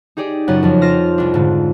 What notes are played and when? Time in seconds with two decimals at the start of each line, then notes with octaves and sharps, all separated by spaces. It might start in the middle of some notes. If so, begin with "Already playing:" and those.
0.17 D#4 G4 G#4 D5
0.48 F#2 C#3 C#4 F4 F#5
0.63 F2 F3
0.82 F4 C5 F6 A#6
1.18 C2 D4
1.34 G#2 D3